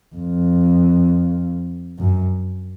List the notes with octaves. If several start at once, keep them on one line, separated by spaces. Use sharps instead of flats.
F2
F#2